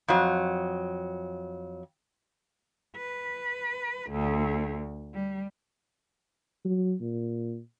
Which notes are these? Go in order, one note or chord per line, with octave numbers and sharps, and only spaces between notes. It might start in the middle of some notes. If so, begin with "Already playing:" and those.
F2 F#3
B4
D2
G3
F#3
A#2